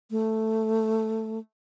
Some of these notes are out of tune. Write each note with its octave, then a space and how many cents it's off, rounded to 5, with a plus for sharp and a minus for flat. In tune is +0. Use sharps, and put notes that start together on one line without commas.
A3 +5